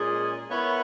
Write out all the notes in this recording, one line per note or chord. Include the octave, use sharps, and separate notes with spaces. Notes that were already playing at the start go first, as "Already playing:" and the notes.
Already playing: A#2 G#3 C#4 G#4
B3 E4 A#4 C#5